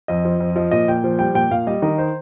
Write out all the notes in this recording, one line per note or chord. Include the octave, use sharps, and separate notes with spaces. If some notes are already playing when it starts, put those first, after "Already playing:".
F2 D#5
F3
F2
F3 D#5
A#2 D#5
A#2 G5
F3
G3 G5
A#2 G5
A#2 F5
G3 D#5
D#3 D#5
C5